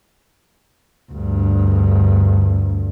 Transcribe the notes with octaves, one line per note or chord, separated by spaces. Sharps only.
D2 G2